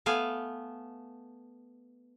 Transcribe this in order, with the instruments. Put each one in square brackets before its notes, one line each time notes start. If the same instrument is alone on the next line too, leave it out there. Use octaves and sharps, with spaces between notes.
[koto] A3 B3 F5 G#5